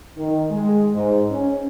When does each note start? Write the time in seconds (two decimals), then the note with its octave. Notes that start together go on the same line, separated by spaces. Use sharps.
0.16 D#3
0.51 G#3
0.93 G#2
1.30 C#4